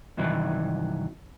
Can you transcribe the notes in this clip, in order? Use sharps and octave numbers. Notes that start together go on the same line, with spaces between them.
G2 C3 D#3 E3 F#3